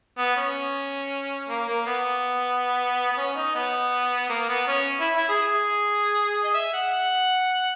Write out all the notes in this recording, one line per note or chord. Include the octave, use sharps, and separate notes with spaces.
B3
C#4
A#3
A#3
B3
B3
C#4
D#4
B3
A#3
B3
C#4
E4
E4
G#4
G#4
D#5
E5
F#5
F#5